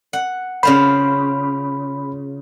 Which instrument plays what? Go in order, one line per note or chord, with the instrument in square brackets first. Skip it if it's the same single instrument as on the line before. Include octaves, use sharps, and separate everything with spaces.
[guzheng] F#5
[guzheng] C#3 F4 C5 [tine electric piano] B5